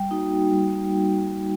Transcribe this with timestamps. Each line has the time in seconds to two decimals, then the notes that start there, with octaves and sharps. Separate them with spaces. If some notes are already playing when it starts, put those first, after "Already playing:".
Already playing: G3 G5
0.08 A#3 D#4 F#4
0.52 G3